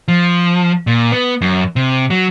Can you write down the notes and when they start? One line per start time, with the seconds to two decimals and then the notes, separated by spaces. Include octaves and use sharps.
0.08 F3
0.87 A#2
1.12 B3
1.41 F#2
1.76 C3
2.10 F#3